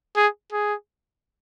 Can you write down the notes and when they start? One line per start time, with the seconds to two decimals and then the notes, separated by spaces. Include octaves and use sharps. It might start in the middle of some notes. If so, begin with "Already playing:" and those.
0.16 G#4
0.52 G#4